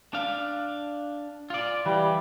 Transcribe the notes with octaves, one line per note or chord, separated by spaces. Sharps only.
D4 F5
F4 D5
E3 G3